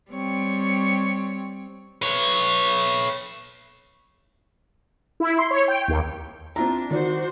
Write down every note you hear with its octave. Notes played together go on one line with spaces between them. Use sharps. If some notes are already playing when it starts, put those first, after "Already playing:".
G3 C4 C#5
B4 C#5
E4
C6
C#5
G5
D#2
C4 D4 E4 F4 A#5
D#3 F#4 C5 D5